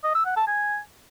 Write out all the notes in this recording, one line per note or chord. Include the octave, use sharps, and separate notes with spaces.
D#5
E6
F#5
A5
G#5